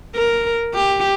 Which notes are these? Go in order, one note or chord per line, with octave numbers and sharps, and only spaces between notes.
A#4
G4